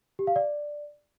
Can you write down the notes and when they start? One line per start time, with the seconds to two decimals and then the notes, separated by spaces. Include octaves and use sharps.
0.19 G4
0.27 F5
0.36 D5